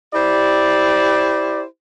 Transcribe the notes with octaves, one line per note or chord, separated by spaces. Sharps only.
E4 G4 C5 D5